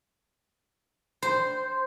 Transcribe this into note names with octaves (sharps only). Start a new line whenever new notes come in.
C5